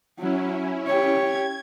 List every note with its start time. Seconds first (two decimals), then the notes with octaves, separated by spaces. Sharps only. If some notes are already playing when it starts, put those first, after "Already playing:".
0.19 F#3 C#4 E4
0.87 G4 C#5
1.26 G#6